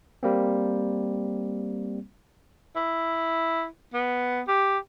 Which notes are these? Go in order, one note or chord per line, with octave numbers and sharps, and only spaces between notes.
G3 A#3 C4
E4
B3
G4